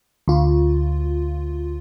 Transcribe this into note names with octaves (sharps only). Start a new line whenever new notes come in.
D2 F4